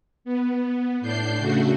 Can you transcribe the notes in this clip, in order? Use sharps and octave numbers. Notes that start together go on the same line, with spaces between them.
B3
A2 D4 G6 C7
C#3 A3 F#4